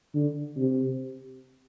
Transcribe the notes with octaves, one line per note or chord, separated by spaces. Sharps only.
D3
C3